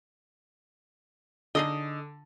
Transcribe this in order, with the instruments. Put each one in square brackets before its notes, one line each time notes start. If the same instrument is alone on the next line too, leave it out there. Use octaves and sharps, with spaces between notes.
[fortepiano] D3 [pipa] D#4 G#4 D#5